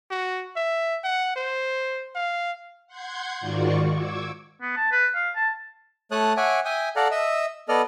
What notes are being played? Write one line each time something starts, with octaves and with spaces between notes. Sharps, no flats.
F#4
E5
F#5
C5
F5
F#5 C6 G6 G#6
G#2 D#3 F4 F#4 D5 C#6
C#6 D6 E6 G#6
B3
A5
B4
F5
A5
A3 C#5 A5 D#6 F#6
C#5 E5 F#5 G#5 D6
E5 G5 G#5 D#6
A4 D5 F5 F#5 A#5
D#5 E5 E6
B3 A4 D5 D#5 F6